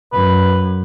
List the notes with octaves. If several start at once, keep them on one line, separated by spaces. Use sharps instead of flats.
F#2 B4